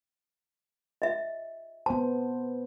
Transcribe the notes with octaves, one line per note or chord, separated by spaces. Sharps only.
D#5 E5
B3 C5 A5